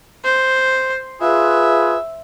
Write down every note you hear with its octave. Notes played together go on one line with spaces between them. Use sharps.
C5
F4 G#4 B4 E5